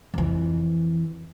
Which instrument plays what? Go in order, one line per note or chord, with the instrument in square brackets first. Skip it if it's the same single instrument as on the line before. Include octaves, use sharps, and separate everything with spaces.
[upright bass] F2 E3